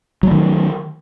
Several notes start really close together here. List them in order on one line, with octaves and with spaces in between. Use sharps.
F#3 A3 D#3